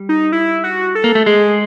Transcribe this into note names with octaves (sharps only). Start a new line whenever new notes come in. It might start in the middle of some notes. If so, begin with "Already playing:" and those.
Already playing: G3
D#4
E4
F#4
A4
A#3
A3
G#3 G#4